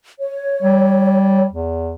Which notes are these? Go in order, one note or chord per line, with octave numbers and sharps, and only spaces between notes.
C#5
G3
E2